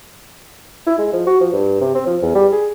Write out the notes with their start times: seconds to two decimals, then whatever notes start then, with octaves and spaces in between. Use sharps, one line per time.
0.86 E4
0.98 G#3
1.13 F3
1.27 F#4
1.41 F3
1.53 G2
1.81 C3
1.95 C4
2.07 F3
2.22 E2
2.35 G3
2.52 G#4